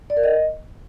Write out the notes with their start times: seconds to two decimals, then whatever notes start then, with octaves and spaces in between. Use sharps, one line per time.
0.10 D5
0.17 A#4
0.23 D#5